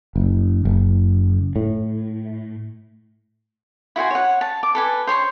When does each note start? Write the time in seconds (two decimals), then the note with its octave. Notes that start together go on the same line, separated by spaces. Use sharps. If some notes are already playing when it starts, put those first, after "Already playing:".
0.16 F#1
0.65 F#1
1.56 A2
3.96 E4 F#4 C5 G#5
4.11 C#5 F#5
4.41 A5
4.63 D6
4.75 A4 B4 G#5
5.07 C5 C#5 C6 C#6